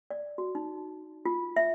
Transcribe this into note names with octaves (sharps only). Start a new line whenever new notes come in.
D5
F#4
D#4
F4
E5